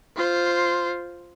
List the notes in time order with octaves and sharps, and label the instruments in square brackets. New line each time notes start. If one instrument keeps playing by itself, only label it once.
[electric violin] F4 C5